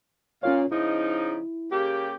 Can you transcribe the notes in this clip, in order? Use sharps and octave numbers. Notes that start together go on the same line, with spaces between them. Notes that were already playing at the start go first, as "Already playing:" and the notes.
A#2 C#4 F4 C#5 F5
C#3 F3 D#4 E4
C#3 A#3 G4